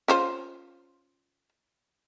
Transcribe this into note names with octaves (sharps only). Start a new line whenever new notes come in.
C#4 F4 C5